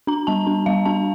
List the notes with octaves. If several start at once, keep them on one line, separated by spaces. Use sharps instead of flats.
D4 A#5
G3 A5
D4
G3 F5
D4 A5